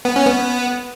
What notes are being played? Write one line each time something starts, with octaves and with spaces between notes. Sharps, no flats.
B3
C#4
B3